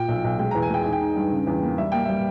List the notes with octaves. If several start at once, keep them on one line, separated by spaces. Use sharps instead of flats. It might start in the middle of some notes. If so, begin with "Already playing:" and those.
Already playing: A#2 G5
B1
B1
G#3 G5
E2 A#5
G#5
G#3 G5
D#4 G#5
G5
D#4
G2
C#3
E2
A#3
G3 E5
A#3 G5
G3 E5